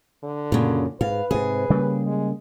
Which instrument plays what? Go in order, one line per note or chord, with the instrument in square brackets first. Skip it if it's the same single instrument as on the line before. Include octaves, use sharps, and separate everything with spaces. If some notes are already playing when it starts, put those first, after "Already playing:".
[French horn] D3
[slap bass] F#2 [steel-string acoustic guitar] A#2 C#3
[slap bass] G#2 [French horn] B4 [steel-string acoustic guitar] F5
[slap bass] G#2 C3 [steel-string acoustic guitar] G#4
[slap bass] C#3 G3 A#3
[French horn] G#3